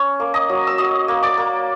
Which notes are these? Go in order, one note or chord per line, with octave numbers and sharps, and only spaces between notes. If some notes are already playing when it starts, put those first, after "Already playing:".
Already playing: C#4 C#5
A#3
D#5 D#6
F#3
E6
F#3 D#5 D#6
A#3
D5 D6
A#3